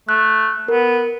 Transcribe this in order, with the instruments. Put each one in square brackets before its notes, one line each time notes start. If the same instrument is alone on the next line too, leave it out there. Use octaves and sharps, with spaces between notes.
[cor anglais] A3 [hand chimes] F#6
[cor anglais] B3 [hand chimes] A#4